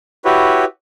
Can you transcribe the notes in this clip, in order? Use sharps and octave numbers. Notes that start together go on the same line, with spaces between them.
E4 F#4 G4 B4 C#5